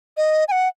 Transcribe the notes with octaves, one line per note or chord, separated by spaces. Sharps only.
D#5
G#5
F#5